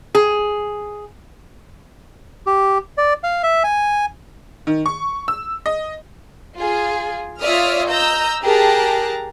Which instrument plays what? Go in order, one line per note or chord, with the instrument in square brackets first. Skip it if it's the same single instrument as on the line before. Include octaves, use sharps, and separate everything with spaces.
[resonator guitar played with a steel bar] G#4
[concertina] G4
D5
F5
E5
G#5
[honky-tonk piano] D#3
C#6
E6
D#5
[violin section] F4 G#4
F4 C#5 D5 E5 D#6 F6
D#5 A#5 E6 G6
G4 G#4 A#4 A5 A#5 F#6